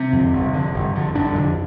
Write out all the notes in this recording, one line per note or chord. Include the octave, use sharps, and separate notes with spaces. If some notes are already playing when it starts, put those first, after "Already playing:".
Already playing: C3 C4
F2 D3
G1
F2 D3
G1
F2 D3
G1 D3 D4
F2 D3